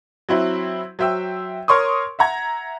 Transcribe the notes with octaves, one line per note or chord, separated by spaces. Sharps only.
F#3 C4 E4
F#3 C5 E5 G5 E6
A#4 C#5 C6 C#6 D#6
E5 F#5 A#5 G#6